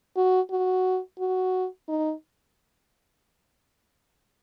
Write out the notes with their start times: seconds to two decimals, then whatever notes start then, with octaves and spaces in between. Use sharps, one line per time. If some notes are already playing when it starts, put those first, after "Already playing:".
0.17 F#4
0.51 F#4
1.19 F#4
1.88 D#4